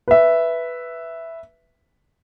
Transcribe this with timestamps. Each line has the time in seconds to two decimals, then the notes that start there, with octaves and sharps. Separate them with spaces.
0.08 B4 E5